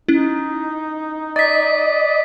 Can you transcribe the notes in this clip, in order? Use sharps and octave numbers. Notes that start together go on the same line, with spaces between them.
C#4 D#4 E4
D5 D#5 A6 B6